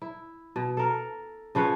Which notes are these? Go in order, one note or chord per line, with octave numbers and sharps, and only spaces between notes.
E4
B2
A4 A#4
C#3 F3 B4 C#5